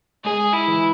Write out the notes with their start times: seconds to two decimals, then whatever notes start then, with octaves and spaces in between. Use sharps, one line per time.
0.24 G#3 G#4
0.53 E4
0.67 E3